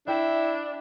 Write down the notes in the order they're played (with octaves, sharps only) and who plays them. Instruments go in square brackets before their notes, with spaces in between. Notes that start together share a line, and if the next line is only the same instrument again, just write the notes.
[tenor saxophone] D4 [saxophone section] E4 [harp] E5 G5